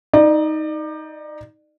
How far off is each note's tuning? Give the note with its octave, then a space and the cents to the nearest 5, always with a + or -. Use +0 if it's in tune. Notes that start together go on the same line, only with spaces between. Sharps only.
D#4 +10 D5 +35